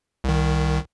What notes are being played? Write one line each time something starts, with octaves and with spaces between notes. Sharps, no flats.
C2 D#3